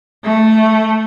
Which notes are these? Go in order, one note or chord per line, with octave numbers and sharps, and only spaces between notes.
A3